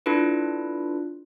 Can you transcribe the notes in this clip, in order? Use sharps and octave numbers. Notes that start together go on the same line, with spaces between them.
D4 E4 F4 A4 B4